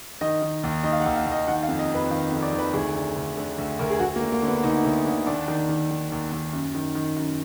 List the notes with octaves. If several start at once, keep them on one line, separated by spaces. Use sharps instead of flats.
D#3 D#5
D#3
D#2
D#3 D#5
F5
F#5
D#2
F5
D#2
D#5
D#3 F#5
F5
F2
D#5
F2
B4
D#3 F5
F2
D5
D#3
B4
D2 G#4
D3
D2
D3
D2
D2 A#4
G#4
D2 F#4
A#3
D3
A#3
D3
B3
D2 D#4
D2
D3
D#2 D4
D#3
D#3
D#3
D#2
D#2
F#2
D#3
D#3
F#2